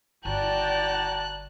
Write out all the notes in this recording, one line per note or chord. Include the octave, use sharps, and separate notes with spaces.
G1 F#4 D5 G5 A5 A#5 F#6